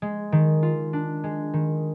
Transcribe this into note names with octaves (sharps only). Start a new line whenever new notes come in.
G#3
D#3
F4
D4
G#3
D#3